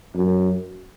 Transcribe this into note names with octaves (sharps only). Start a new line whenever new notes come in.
F#2